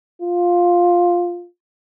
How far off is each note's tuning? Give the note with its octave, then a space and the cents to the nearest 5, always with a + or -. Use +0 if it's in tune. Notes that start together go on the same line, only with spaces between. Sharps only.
F4 +5